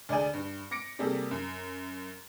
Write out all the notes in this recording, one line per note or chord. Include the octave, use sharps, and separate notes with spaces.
D2 D4 G#4 D5 G#5
G2
D6 A#6 C#7 D7
C3 G3 A#3 G#4 A4
F#2